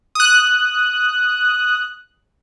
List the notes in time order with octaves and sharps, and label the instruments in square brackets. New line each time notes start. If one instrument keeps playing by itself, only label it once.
[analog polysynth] D#6 F#6